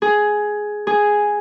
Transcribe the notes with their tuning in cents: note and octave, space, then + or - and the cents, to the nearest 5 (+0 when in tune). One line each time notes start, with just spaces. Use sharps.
G#4 +10
G#4 +0